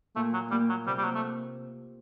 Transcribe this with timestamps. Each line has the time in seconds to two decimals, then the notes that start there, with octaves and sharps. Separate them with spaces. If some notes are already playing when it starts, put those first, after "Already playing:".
0.16 A#2 A3
0.33 F#3
0.51 G3 A#3
0.69 F#3
0.86 C3 G3
0.98 G3
1.04 F#3
1.15 A3